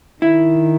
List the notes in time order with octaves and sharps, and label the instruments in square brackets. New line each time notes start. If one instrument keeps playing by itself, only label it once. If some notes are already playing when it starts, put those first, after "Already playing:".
[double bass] D#3 [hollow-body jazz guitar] E4